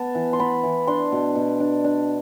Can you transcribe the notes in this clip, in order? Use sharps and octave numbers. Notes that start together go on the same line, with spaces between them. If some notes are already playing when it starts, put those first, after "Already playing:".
Already playing: B3 A5
E3
C6
B3 B5
E3
D4 C6
B2
B2
D4
D4